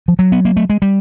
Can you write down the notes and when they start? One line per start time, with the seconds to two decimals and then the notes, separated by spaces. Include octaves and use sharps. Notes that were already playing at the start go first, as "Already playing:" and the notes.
0.08 F3
0.19 F#3
0.32 B3
0.45 A#3
0.57 A3
0.70 G#3
0.82 G3